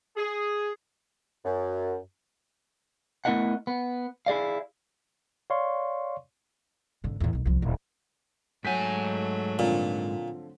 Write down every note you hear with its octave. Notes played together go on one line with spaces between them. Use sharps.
G#4
F#2
A3 B3 E4 A#4 D#5 F#5
B3
E4 G#4 D5 F5
C#5 D5 F5 C6 C#6
G#1 D3
E2 A2
B1 D#3
C2 F3
D#1
G#2 F#3 A3 F#5 G#5 G6 B6
A#2 D3 F3 C4